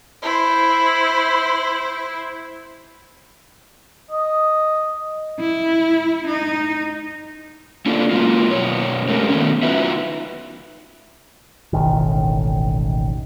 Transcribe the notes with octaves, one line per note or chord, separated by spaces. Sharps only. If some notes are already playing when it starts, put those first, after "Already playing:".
E4 C5
D#5
E4
D#4
A#3 C#4 D4 F4 A4
F#3 G#3 A#3 F4
F#2 B2 C#5
G#3 A3 C#4 G4 A#4
D#3 A3 B3 C#4
D#4 F4 F#4 B4 E5
E1 A1 D#3